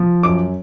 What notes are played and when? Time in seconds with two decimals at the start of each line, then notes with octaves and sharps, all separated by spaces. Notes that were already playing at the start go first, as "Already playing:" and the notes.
Already playing: F3
0.23 F#2 D6